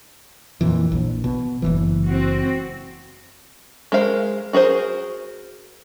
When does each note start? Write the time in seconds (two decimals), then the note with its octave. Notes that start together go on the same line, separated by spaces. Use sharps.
0.61 F2 A#2 E3
0.92 A#1
1.24 B2
1.62 F#1 B1 E3
2.07 C4 F#4
3.92 G#3 A#4 C5 F5
4.53 F#4 G#4 A#4 C5